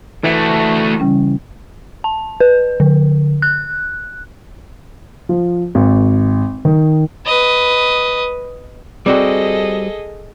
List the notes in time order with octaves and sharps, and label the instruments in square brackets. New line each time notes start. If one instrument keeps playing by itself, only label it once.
[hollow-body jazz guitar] E3 [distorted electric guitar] A3 F#4
[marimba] C#3 G3 C#4
[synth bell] A5
B4
D3
F#6
[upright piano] F3
G#1
D#3
[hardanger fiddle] B4 D#5
[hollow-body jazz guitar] G3 C4 F#4 [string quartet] G#4 A4 D#5